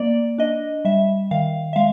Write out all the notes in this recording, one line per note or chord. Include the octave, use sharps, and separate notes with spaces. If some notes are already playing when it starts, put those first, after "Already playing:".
Already playing: A#3 D5
D4 D#5
G3 E5
D#3 F5
E5
G#3 F5